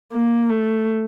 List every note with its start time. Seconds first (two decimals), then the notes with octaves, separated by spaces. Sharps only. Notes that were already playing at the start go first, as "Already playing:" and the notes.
0.12 A#3
0.50 A3